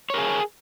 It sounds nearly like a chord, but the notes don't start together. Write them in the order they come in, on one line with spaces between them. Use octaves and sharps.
C#5 A#4 G#4